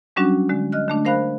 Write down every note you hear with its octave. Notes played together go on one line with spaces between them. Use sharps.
F#3 G3 C#4 D4 F#4
D3 G#3
D#5 F6 F#6
D3 A3 D4
A#4 C5 F5 B5 F#6